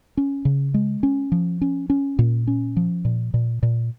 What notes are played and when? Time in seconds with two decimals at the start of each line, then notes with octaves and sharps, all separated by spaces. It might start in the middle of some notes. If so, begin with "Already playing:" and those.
0.17 C#4
0.45 C#3
0.74 G#3
1.03 C#4
1.32 F3
1.61 C#4
1.90 C#4
2.19 A#2
2.47 C#4
2.77 F3
3.05 A#2
3.34 A#2
3.63 A#2